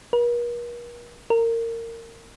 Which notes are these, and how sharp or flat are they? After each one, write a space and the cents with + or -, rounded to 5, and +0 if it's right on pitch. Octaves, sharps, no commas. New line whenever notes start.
A#4 +45
A#4 -25